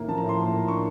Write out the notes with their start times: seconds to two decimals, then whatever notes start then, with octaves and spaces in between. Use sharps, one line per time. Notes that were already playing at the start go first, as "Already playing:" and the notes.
Already playing: A2 D#3 A#3
0.08 F3 A5
0.18 A#5
0.24 A2
0.29 C6
0.39 A#3
0.53 A#3
0.68 D4 C#6